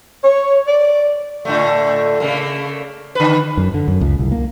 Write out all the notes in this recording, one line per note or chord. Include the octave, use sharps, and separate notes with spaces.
C#5
D5
A2 D3 A3
C#3 A3 A#3
D3 B4
F#2
D3
F#2
C#2
C2
A#3